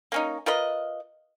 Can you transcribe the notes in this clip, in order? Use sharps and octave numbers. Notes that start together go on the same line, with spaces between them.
A#3 C#4 D#4
F4 A#4 B4 D#5